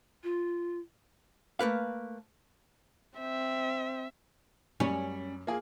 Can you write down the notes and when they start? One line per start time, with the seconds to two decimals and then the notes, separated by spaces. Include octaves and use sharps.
0.24 F4
1.59 A3 A#3 B4 F5
3.19 C4 E5
4.80 F#2 G3 C#4
5.47 A#3 F4 G#4